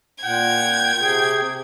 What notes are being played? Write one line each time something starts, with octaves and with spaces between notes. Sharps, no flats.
A#2 F#5 G5 G#6
C3 G#4